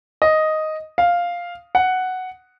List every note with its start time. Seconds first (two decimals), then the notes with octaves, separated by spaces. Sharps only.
0.22 D#5
0.98 F5
1.75 F#5